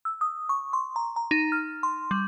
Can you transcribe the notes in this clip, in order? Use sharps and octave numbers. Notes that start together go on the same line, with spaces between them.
E6
D#6
C#6
C6
A#5
A#5
D#4
F6
C6
G3